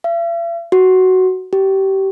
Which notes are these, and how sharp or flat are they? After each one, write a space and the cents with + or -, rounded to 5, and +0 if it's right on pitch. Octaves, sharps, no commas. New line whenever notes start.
E5 +45
F#4 +10
G4 -25